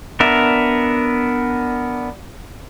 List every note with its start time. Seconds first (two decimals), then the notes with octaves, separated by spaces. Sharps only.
0.20 B3 D4 A#4 E5